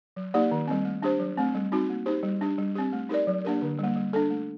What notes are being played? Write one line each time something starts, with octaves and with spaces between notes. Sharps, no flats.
F#3
A#3 D#4 G4 D5
D#3
G3 C4
A3
D4 G4 C5
F#3
A3 C4
G3
C4 D#4 F#4
A#3
D#4 G4 C5
G3
D4 G4
G3
C4 G4
A3
D#4 G4 A#4 D5
F#3
A#3 D4 G4 A#4
D3
G3
A#3
G3
D4 A4
A3